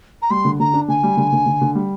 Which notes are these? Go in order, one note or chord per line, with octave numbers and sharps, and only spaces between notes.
A#5
G3 C6
D3
D3 A#5
D4
D3 G#5
G3
D3
D3
D3
D3
G3